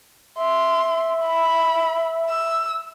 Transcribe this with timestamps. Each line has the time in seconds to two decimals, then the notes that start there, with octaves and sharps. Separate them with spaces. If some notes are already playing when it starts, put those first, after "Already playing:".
0.39 E5 C6
1.25 B5
2.29 E6